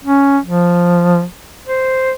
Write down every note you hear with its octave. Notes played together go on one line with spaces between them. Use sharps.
C#4
F3
C5